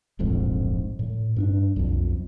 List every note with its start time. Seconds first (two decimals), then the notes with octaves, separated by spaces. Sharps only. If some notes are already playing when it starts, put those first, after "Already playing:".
0.19 D1 A#1 F2 G#2
0.99 A2
1.36 G2 C#4 D4
1.76 B1 F2